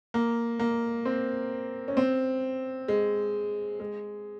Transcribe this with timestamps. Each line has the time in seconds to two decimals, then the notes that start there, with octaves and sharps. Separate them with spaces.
0.14 A#3
0.59 A#3
1.05 C4
1.88 C#4
1.97 C4
2.88 G#3
3.80 G#3